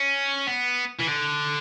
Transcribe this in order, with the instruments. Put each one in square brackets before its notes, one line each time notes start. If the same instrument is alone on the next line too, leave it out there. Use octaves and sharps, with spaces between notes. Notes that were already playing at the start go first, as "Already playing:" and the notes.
Already playing: [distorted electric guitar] C#4
B3
E3
D3